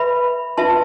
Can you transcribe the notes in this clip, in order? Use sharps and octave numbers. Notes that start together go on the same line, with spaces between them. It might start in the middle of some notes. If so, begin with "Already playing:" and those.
Already playing: B4 E5 B5
F4 B4 E5 A5 C6